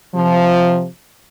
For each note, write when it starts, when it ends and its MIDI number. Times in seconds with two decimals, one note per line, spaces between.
0.15 0.87 48
0.15 0.87 53